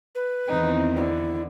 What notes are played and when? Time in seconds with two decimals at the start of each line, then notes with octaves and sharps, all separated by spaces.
0.15 B4
0.48 E2 D#3 C4 D#4
0.96 D3 E4